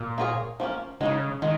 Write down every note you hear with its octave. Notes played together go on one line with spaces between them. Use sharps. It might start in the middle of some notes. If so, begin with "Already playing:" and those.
Already playing: A#2
A#3 F4 G#4 C#5
F3 A#3 C#4
C#3 G#3 D#4 C#5
D#3 G#3